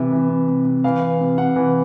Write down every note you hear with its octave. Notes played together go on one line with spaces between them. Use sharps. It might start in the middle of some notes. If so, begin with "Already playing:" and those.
Already playing: C3 E3 E5
E3
C3
C3
C3
E3 F5
E3
C3
C3 F#5
E3